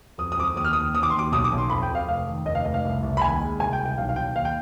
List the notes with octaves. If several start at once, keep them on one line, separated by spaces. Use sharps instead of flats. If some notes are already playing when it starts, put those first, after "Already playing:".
F2 D#6
D#6
F2 D6
D#6
D#2 D#6
F6
D#2 D#6
D#2 D#6
D6
D#2 C6
D6
B1 D#6
D6
B1
C6
F2 B5
G5
F2
F5
F1 F5
D#3
F1 D#5
F5
F1 D#5
F5
C2
C2
B5
D#2 G#5
G#3
C2 G#5
G5
C2
G5
B1 F5
F5
B1 G5
D#2 F5
G5